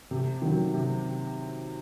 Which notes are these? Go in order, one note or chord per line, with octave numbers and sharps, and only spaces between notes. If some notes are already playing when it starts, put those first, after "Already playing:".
C3
D#3 F#3
C3